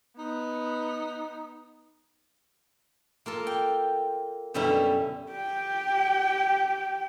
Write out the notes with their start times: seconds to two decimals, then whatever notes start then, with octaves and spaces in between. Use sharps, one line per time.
0.18 B3 D#4
3.26 A#3 F4 A4
3.47 G5
4.54 F#2 B2 D3 G3 C#4 E4
5.32 G4 G5